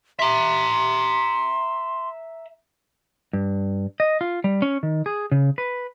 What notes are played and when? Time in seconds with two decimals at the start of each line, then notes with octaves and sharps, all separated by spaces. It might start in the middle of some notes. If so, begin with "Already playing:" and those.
0.19 E5 A#5 C6
3.33 G2
4.00 D#5
4.21 F4
4.44 G3
4.62 C#4
4.83 D#3
5.06 G#4
5.32 C#3
5.58 B4